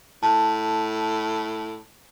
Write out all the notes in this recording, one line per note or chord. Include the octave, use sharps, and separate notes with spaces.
A2 A5